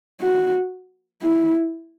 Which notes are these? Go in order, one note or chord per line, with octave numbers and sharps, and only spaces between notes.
F#4
E4